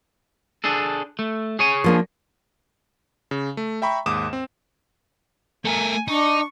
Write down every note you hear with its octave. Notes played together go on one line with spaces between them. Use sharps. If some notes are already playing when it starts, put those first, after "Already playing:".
D4 G#4 A4
A3
G#4 C#5 G#5
F3 A#3 D4
C#3
A3
E5 G5 A#5 B5 C#6
D#2 G#2 D6 D#6 E7
C4
A3 A#4 G#5
D4 D#4 C#6